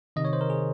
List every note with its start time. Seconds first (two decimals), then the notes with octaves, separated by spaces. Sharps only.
0.16 C3 D#3 D#5
0.25 C#5
0.33 C5
0.41 A#4
0.50 G#4